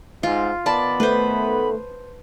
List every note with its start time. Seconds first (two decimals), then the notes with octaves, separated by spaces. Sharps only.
0.23 G#2 F4
0.66 D#3 B3 D5 A5 B5
1.00 A3 B4 C5